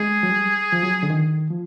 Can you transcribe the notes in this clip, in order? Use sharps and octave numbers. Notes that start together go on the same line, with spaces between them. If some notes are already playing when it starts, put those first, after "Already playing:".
Already playing: G#3 G#4
F#3
G3
F3
F#3
D3
D#3
F3